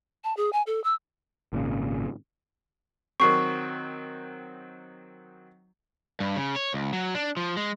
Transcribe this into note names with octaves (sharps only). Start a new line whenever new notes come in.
A5
G#4
G#5
A4
E6
G#1 A#2 C#3
D#3 F#3 C4 C#6 C7
G2
C#3
C#5
C#2
F#3
D4
F3
G#3